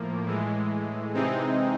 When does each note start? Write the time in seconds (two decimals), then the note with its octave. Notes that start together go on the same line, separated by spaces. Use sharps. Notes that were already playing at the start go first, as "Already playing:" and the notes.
Already playing: A2 F3 A#3
0.25 A2 E3 G#3
1.14 C3 E3 G#3 C4 D#4